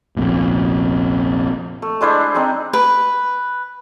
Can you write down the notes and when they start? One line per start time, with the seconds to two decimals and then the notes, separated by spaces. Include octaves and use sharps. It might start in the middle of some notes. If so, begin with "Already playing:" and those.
0.16 F1 A#1 F2
1.82 A3
2.01 G#3 D4 E4 C5
2.34 G#3 C4 D#4
2.73 B4